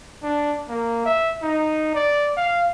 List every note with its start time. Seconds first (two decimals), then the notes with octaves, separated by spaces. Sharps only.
0.23 D4
0.69 A#3
1.05 E5
1.42 D#4
1.94 D5
2.37 F5